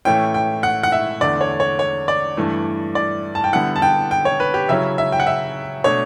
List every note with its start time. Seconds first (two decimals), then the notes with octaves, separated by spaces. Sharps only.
0.05 A2 E3 A3 C#4 E4 G5
0.34 G5
0.63 F#5
0.83 F#5
0.92 E5
1.21 E2 D3 A3 D5
1.41 C#5
1.60 C#5
1.79 C#5
2.08 D5
2.37 G2 E3 A3 E4
2.95 D5
3.35 A5
3.44 G5
3.53 D3 G3 B3 E4 F#5
3.76 A5
3.82 G5
4.11 G5
4.25 C#5
4.40 B4
4.54 G4
4.69 C#3 F#3 C#4 E4 E5
4.98 E5
5.12 G5
5.20 F#5
5.27 E5
5.84 B2 A3 D4 C#5